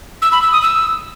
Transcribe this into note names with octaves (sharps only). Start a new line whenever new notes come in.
E6
B5
E6
D#6
E6